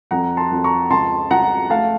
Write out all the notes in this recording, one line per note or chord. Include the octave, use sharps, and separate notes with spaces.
F2 F#5 A#5
A5 C6
F2
A#5 C#6
C#2 A5 C6
C#2 F#5 A#5
A3 F5 A5